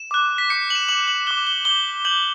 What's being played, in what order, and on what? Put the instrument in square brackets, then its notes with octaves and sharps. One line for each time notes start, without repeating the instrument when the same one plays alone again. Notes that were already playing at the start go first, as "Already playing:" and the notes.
Already playing: [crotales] E7
D6 F#6
B6
D6 G6 C#7
F#7
E7
D6 G6 F#7
F#7
D6 F#6 G7
G7
D6 G6 G7
D6 G6 F#7